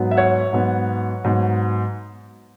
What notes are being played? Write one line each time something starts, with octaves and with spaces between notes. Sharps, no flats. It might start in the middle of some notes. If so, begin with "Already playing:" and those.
Already playing: G#2 F#3 B3
E5
C#5 F#5
G#2 F#3 B3
G#2 F#3 B3